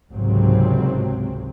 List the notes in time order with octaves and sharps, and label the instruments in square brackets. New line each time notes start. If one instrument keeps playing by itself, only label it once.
[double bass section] G#1 C#2 G#2 C3 F#3 C4